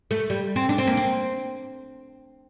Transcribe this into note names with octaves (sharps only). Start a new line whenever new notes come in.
A3
G3
C4
D4
C4
A#3
C4